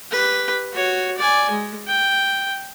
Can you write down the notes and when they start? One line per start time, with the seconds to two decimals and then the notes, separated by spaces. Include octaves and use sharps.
0.12 G4 B4
0.73 F#4 C#5
1.18 D5 G#5
1.51 G#3
1.88 G5